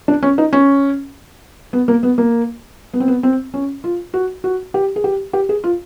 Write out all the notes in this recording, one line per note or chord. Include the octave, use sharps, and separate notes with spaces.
D4
C#4
D#4
C#4
B3
A#3
B3
A#3
B3
C4
B3
C4
C#4
F4
F#4
F#4
G4
G#4
G4
G4
G#4
F4